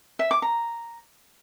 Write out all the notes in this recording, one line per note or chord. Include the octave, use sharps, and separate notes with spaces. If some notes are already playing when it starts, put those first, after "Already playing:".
E5
D6
A#5